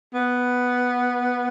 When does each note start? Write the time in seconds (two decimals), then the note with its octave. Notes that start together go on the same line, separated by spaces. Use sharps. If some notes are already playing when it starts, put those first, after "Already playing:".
0.14 B3